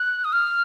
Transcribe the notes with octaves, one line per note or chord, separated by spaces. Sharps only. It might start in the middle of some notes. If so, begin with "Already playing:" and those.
Already playing: F#6
D#6
F6